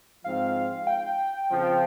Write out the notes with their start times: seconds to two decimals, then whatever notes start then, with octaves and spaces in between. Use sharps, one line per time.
0.24 G#2 F3 C4 F4 F5
0.87 G5
1.49 F2 C#3 F3